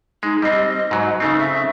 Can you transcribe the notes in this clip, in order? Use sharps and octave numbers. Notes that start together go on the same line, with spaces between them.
G#3 D#4
G3 C4 D#5
G#2 F#3
C#3 A3 C4 D#4
E5